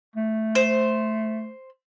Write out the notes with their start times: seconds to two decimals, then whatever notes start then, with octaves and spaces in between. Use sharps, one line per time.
0.16 A3
0.55 C5